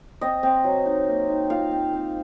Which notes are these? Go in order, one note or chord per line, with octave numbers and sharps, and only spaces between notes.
C4 D#5
C4
F#3
D#4
A#3
D#4
F4 F5
C4
C4